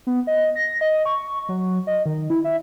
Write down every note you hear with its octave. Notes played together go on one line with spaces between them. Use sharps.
B3
D#5
A#6
D#5
C#6
F#3
D#5
D#3
E4
E5